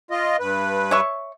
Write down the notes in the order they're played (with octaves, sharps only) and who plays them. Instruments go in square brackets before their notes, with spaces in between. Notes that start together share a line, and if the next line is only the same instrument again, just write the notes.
[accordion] F4 D#5
G2 B4
[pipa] C#5 E5 C#6